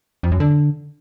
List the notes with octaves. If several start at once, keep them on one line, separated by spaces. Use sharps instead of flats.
F2
F#2
D3